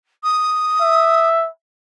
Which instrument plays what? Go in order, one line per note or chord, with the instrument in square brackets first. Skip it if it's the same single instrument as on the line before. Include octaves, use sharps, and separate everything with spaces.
[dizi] D#6
[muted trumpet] E5